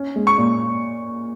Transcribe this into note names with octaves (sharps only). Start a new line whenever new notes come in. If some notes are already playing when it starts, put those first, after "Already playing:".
Already playing: C#4
G#3
C#6
A#2